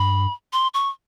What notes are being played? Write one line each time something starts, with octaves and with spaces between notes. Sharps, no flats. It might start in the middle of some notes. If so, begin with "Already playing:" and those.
Already playing: G2 B5
C6
C#6